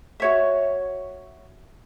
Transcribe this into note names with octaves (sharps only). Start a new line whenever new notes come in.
F#4 C#5 E5